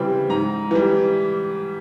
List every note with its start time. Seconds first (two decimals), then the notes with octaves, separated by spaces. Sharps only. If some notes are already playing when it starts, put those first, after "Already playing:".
Already playing: C#3 E3 G3 C4 G5
0.30 G#2 A#5
0.71 E3 G3